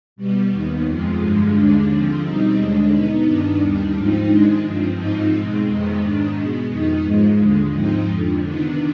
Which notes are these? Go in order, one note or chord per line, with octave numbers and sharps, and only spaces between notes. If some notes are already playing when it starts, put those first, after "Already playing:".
B2 G3 B3
D#2 D#3 B3
F2 C3 F3 G#3
G2 D3 F3 G#3
D#2 D3 G#3 D4
D3 F3 C4
B2 G3 C4 D#4
D#2 D3 G#3 D4
B2 B3 D#4
G2 D#3 B3 D4
D#2 D#3 G3 D4
G#2 F3 C4 D#4
C3 D#3 G#3 D4
G2 F3 C4
G#2 F3 C4 D#4
B2 G#3 C4
F2 C3 D#3 G#3 B3
G#2 D#3 B3 D4
B2 G#3 B3
F2 D#3 B3 D#4
G#2 F3 G#3
D#2 D3 G#3
G#2 F3 C4 D#4
F2 D3 F3
C3 D#3 B3 D4